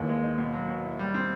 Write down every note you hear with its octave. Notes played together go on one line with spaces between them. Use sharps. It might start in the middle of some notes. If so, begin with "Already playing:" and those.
Already playing: D#2 D#3 E3
G#3
D#4
B2
F#3
B2
E4
G3
C4